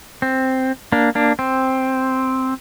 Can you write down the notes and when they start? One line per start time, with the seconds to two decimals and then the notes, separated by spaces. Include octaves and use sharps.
0.22 C4
0.92 A#3 D4
1.15 A#3 D4
1.39 C4